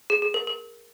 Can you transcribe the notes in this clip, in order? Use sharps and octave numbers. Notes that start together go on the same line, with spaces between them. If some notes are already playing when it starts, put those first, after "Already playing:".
G#4
G#4
A#4
A#4